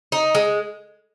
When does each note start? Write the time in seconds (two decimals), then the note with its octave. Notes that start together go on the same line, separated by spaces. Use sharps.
0.12 D#4
0.35 G#3